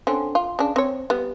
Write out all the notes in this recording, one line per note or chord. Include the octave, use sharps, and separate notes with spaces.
D3 C4 C#4
F4
C#3 D4
C4 C#5
G3 B3